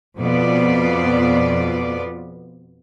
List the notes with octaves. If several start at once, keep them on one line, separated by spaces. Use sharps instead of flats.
F2 B2 B3 F4 D5